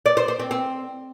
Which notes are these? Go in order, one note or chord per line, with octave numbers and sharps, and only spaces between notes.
D5
C5
C5
C4
C4